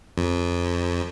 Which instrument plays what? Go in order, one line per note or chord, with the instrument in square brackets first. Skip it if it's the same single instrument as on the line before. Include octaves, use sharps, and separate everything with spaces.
[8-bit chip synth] F2